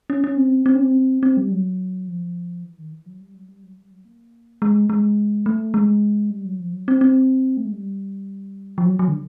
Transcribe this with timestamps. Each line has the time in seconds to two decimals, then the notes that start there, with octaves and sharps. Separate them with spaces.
0.10 C#4
0.24 C#4
0.37 C4
0.66 C4
0.75 C#4
0.80 C4
1.23 C4
1.37 G3
1.51 F#3
2.08 F3
2.64 E3
2.78 D#3
2.92 E3
3.06 F#3
3.21 G3
3.34 F#3
3.49 G3
3.63 F#3
3.77 G3
3.91 F#3
4.05 A#3
4.62 G#3
4.90 G#3
5.46 A3
5.74 G#3
6.30 G3
6.45 F#3
6.60 F3
6.73 F#3
6.88 C4
7.01 C4
7.57 A3
7.65 G#3
7.72 G3
8.78 F3
8.85 F#3
8.99 F#3
9.08 D3